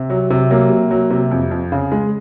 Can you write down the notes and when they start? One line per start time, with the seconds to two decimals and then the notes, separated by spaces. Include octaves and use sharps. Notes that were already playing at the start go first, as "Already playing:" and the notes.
Already playing: C3
0.10 F#3
0.30 C3
0.51 F#3 A#3
0.70 C3
0.91 F#3
1.10 C3
1.31 F2
1.51 F2
1.72 C#3
1.92 G#3